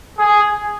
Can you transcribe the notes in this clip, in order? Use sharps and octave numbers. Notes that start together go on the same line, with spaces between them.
G#4